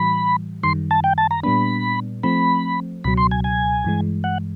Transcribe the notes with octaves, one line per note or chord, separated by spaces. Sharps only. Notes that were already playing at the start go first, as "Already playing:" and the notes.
Already playing: A2 E3 G3 B5
F#2 D#3 G3 C6
A5
G5
A5
A#5
A#2 G3 B3 D4 B5
F3 A3 C4 B5
C#2 B2 F#3 B5
C6
G#5
G#5
G2 E3 G#3
F#5